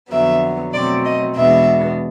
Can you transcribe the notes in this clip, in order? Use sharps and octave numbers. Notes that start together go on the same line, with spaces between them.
F2 D3 F#3 B3 E5
B2 F#3 A3 C4 D5
D#5
E2 B2 G#3 B3 D4 E5